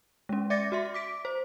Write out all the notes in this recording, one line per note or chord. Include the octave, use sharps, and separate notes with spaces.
G#3 C#4
D5 E5 D6 A6 A#6 C#7
F#4 E5 C6
D6 B6 D7
C5